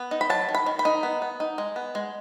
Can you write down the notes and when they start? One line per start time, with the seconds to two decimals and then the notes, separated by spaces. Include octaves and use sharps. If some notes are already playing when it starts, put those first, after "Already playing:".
Already playing: B3
0.11 D#4
0.21 B5
0.30 F#3 A5
0.49 D#3
0.55 B5
0.66 D#3
0.79 B5
0.85 D#4
1.03 B3
1.22 B3
1.40 D#4
1.58 G#3
1.76 B3
1.95 G#3